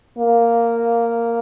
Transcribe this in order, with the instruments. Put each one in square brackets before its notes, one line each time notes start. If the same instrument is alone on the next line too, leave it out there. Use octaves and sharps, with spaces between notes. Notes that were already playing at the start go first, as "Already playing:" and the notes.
[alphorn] A#3